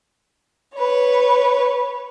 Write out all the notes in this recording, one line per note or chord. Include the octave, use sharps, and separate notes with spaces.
B4 C#5